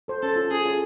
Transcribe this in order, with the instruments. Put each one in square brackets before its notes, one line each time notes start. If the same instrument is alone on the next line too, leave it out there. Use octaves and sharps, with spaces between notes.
[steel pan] A4 C5
[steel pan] C#4 [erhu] A4
[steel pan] F4 A4
[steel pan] C#4 [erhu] G#4
[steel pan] F4 A4